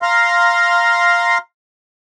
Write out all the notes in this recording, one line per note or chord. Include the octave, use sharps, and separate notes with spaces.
F5 A#5 C6